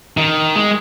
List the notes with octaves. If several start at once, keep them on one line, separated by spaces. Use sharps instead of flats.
D#3
G#3